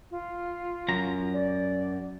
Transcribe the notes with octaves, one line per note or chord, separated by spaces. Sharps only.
F4
F#2 A#5
D5